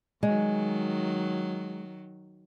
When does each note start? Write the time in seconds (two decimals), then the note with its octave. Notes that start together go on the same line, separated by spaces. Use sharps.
0.23 D#3 F#3 G#3